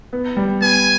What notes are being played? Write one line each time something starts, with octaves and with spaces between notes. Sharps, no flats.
B3
G3
B3 G#5